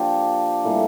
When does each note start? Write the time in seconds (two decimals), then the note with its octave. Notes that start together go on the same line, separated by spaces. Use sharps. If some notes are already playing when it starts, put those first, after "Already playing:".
Already playing: F3 A#3 D4 G4
0.64 A2 E3 G3 A#3